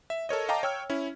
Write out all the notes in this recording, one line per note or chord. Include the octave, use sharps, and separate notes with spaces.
E5
A4 A#4 C#5 D#5
D#5 F5 G5 A5 A#5 D6
C#5 G5 E6 F6
C#4 E4